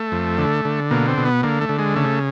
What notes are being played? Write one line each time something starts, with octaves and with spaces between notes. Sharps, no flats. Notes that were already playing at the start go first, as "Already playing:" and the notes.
Already playing: A3
F2
D3
D3
B2 A#3
C4
B2
B3
D3 A#3
A3
D3
G#3
C#3 A3